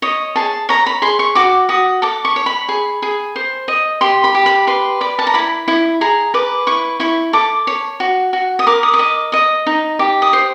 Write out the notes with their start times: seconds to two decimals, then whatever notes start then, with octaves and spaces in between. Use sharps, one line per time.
0.02 C#5 D#5
0.36 G#4 A5
0.69 C#5 A#5
0.86 B5
1.02 G#4 C6
1.19 C#6
1.35 F#4 D6
1.69 F#4 D#6
2.02 A4 D6
2.25 C#6
2.36 C#5
2.46 B5
2.69 G#4
3.02 G#4
3.36 C5
3.68 D#5
4.01 G4 C6
4.24 B5
4.35 G4
4.46 B5
4.67 B4 C6
5.01 D5 B5
5.19 A5
5.27 A#5
5.34 E4 B5
5.68 E4
6.01 G#4 A#5
6.34 B4 D6
6.67 E4 C#6
7.00 E4 C#6
7.33 A4 D6
7.67 C#5
8.00 F#4
8.33 F#4
8.59 D#6
8.67 A#4 D6
8.83 D#6
8.94 D#6
8.99 D#5 D6
9.32 D#5 D#6
9.66 D#4
9.99 G4 D6
10.22 D#6
10.33 C5